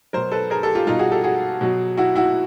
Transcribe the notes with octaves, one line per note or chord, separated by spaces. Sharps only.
B2 F#3 A#4 C5
A4 B4
G#4 A#4
G4 A4
F4 G4
B2 G3 D#4 F4
F#4 G#4
G4 A4
F#4 G#4
B2 F#3
E4 F#4
E4 F#4